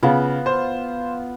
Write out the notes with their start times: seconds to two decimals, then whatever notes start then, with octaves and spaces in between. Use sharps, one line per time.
0.03 C#3 B3 F4
0.46 C5